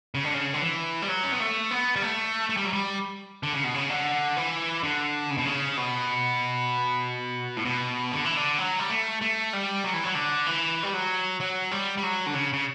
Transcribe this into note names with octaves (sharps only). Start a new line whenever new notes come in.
C#3
D3
C#3
D3
E3
G3
F#3
C#4
B3
A3
B3
G3
A3
A3
G3
F#3
G3
D3
C#3
B2
C#3
D3
E3
D3
C#3
B2
C#3
B2
A2
B2
D3
E3
D3
F#3
G3
A3
A3
G3
F#3
E3
F#3
D3
E3
G3
F#3
F#3
G3
G3
F#3
D3
C#3
C#3